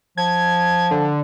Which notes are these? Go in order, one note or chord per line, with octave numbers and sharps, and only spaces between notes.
F3 G#6
D3